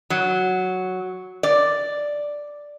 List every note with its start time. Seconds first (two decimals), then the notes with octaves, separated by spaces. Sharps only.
0.10 F#3
1.43 D5